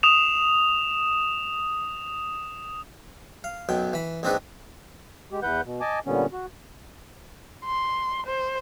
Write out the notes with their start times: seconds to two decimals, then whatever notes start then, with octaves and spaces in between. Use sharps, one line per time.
0.03 D#6 E7 F7
3.44 F5
3.69 B1 F#2 B2 G5
3.93 E3 B5
4.23 A#1 G#2 C4 D4 D#4 B4
5.30 G#3 G4
5.43 E2 E3 B4 F#5 G6
5.65 B2
5.81 D#5 G#5 A5 D6
6.06 A#2 D3 G3 B3 C#4
6.32 F#4
7.65 C6
8.26 C5